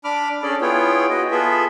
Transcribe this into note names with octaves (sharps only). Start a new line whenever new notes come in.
D4 B5 D6 F6
C#4 D4 G#4 A4 D5
B3 E4 F4 G#4 C#5 G5
F#4 D#5
B3 F4 G#4 A4 E5